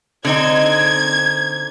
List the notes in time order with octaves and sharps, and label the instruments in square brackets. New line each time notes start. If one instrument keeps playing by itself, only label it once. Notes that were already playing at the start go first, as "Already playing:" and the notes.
[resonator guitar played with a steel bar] D3 C4 D#4 [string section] G#6